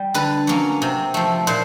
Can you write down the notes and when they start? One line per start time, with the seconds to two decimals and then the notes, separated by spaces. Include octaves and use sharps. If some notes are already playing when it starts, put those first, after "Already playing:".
Already playing: G3
0.14 D3 B4
0.47 F#3 A#3 C#4
0.82 C3
1.14 F3 A3
1.47 A#2 C5